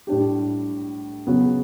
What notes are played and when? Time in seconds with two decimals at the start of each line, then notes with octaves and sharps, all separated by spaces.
0.07 A2 G3 D4 G4
1.27 C#3 F#3 B3